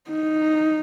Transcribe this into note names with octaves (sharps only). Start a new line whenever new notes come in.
D#4